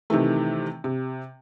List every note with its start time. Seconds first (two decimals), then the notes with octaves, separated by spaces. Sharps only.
0.10 C3 D#3 E3 A3
0.84 C3